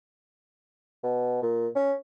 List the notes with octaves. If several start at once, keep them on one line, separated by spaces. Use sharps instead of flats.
B2
A#2
C#4